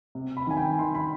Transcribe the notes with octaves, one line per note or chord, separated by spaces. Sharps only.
C3
B5
D#3 G#5
G5
D#3 C6
B5